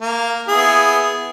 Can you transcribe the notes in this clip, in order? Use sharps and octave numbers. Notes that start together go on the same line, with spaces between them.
A#3
B3 E4 G#4